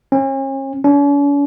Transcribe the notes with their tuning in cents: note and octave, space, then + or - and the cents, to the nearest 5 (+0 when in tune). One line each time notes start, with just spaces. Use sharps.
C#4 -40
C#4 +45